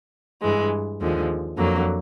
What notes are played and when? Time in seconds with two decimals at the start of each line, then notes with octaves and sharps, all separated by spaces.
0.42 G2 E3 G#3
1.00 D#2 D3 F3 G#3
1.58 F2 D3 F#3 A#3